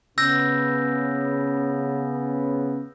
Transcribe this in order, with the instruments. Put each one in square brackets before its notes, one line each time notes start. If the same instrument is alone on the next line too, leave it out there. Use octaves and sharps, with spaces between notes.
[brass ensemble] C#3 B3 [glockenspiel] E6 G6 A#6